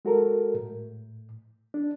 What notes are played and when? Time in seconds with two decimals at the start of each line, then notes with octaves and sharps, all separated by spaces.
0.05 G#3 F#4 A4 A#4
0.54 A2
1.74 D4